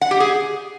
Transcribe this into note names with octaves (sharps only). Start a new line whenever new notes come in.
F#5
G4
G#4